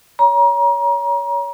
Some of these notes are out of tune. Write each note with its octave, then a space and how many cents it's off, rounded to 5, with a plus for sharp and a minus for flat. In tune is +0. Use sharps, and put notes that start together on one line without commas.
C#5 +20 A#5 +30